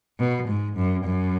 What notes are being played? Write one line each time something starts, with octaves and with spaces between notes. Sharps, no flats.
B2
G#2
F#2
F#2